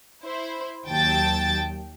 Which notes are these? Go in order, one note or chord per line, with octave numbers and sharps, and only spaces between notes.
E4 C5
D#2 F#3 G5 A5 A6